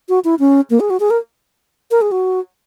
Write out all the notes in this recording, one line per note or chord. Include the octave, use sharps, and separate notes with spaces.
F#4
E4
C#4
A#3
G#4
F#4
G#4
A#4
A#4
G#4
F#4